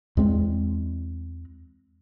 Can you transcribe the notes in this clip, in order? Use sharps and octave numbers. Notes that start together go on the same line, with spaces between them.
E2 G#3 C4